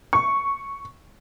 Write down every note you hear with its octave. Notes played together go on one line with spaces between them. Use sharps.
C#6